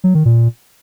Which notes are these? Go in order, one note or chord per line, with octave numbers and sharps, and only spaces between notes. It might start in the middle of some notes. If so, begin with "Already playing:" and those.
F#3
D#3
A#2